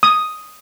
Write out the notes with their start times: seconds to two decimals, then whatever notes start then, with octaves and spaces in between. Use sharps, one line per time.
0.03 D#6